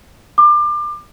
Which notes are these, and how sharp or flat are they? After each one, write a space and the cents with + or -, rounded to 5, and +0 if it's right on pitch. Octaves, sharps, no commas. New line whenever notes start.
D6 +30